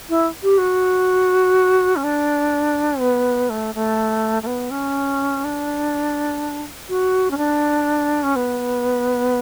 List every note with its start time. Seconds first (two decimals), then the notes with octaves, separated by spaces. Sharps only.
0.09 E4
0.43 G4
0.58 F#4
1.96 C#4
2.04 D4
3.01 B3
3.50 A3
3.75 A3
4.43 A3
4.46 B3
4.71 C#4
5.44 D4
6.89 F#4
7.31 C#4
7.38 D4
8.23 C#4
8.36 B3